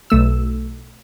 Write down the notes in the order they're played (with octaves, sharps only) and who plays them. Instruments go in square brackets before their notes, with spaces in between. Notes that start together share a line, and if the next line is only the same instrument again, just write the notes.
[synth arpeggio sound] B1 A3 E6